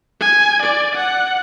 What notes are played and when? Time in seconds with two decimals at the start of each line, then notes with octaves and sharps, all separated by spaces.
0.20 G#5
0.62 D5
0.95 F#5